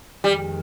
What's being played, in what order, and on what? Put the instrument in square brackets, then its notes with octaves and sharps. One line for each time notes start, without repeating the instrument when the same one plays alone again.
[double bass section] F2 D#3 G#3 [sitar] G3